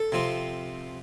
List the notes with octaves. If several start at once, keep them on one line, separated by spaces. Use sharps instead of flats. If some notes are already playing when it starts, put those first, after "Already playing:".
Already playing: A4
C3 F3 C4